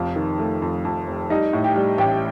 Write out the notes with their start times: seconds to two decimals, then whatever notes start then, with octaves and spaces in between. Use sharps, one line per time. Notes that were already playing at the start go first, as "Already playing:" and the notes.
Already playing: F1 F2 F4
0.16 D#3
0.39 A3
0.62 F2
0.85 F2
1.07 F1
1.30 G3 D#4 D#5
1.53 A2
1.64 G4 G5
1.76 G3
1.98 A1 G4 G5